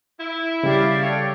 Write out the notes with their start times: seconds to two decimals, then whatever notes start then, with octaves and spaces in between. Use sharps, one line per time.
0.20 E4
0.63 C#3 G3 G4 D5 F5
1.02 A4 C#5 G5